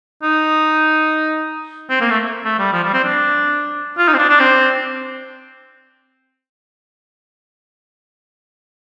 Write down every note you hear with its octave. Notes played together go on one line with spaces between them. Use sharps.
D#4
C4
A#3
A3
A3
G3
F3
G3
C4
D4
F4
D#4
C4
D4
D4
C4